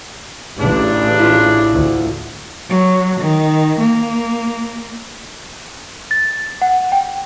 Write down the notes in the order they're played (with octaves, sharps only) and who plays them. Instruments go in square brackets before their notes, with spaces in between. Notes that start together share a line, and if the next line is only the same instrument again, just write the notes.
[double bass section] A1 [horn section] C#3 D4
[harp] E4 F4
[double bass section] D2
[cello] F#3
D#3
A#3
[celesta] A6
F#5
G5